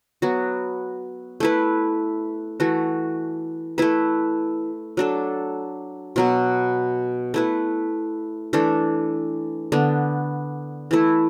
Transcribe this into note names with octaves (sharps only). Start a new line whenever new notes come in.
F#3 B3 F#4
A3 E4 B4
E3 A3 F#4
A3 E4 B4
F#3 D4 A4
B2 F#3 B3
A3 E4 B4
E3 A3 D4 A4
D3 B3 D4
E3 A3 E4